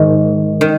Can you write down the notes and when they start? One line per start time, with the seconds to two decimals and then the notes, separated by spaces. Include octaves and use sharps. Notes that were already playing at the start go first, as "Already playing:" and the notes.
Already playing: G#2 D#3
0.61 D#3